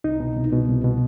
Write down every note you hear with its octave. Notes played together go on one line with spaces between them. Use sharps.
C2 D#4
B2
C2
B2
C2
B2